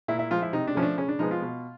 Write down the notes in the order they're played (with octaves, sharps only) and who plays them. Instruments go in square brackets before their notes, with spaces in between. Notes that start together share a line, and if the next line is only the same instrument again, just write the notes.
[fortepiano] A#2 E4
E4
F3 G#3 F4
E4
C3 D#4
D4
F3 A3 C#4
D4
C#3 C#4
D4
F3 G#3 B3 D#4
F4
B2